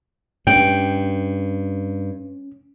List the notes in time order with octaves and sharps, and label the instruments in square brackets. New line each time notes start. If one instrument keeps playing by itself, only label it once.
[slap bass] G2 [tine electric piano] C#4 [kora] G5